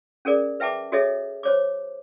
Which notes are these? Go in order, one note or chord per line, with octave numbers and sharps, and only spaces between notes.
C#4 G#4 A#4 D5
B4 E5 G5 A5 D6
F#4 G#4 A4 C#5 D#5 E5
C5 C#5 D6